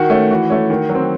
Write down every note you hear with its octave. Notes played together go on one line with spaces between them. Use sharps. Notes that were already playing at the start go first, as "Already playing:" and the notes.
Already playing: D#3 F#4
A3 C#4
E3 F#4
A3 C#4
D#3
F#3
C4